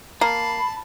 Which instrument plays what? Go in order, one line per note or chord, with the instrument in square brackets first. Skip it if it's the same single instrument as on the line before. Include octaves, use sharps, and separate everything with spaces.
[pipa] A#3 [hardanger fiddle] A5 [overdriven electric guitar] B5 [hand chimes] C7